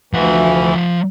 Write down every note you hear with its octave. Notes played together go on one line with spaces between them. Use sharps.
D2 E3 F3 F#5